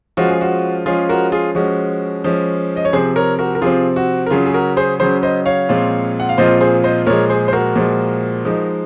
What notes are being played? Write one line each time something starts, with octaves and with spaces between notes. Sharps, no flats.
F3 G#3 C#4 F4 F#4
G#4
F#4
F3 G#3 C#4 F4 G#4
F#4 A#4
F4 G#4
F3 G#3 C#4 F#4
F3 G#3 C#4
D#5
C#5
C3 F3 C4 G#4 C5
A#4 C#5
F#4 A#4
A#4
C3 F3 C4 F4 G#4
F#4
A#4
C#3 F#3 C#4 F4 G#4
G#4
F#4 A#4
G#4 C5
C#3 F#3 C#4 G#4 C5
C5 D#5
C#5 F5
A#2 F3 G#3 C4 F4
F#5
F5
A#2 F3 G#3 C4 F4 C5 D#5
G#4 C5
C5 D#5
A#2 F3 G#3 A#4 C#5
G#4 C5
C5
F#4 A#4
A#2 F3 G#3
F3 G#3 D#4